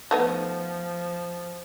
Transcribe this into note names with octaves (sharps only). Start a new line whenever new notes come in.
F3 A3 B3 D#4